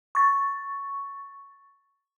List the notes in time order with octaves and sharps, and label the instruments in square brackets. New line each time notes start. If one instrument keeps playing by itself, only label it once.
[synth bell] C#6 A6